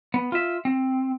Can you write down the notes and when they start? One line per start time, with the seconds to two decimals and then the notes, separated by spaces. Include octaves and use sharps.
0.14 B3
0.32 F4 E5
0.65 C4